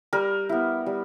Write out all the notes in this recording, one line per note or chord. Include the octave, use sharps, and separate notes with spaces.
G3 A#4
B3 E4
G3